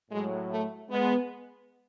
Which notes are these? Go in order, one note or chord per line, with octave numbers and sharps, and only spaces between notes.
A2 F#3 G#3
A3
G#3 B3